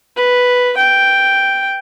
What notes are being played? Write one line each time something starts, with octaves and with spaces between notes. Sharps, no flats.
B4
G5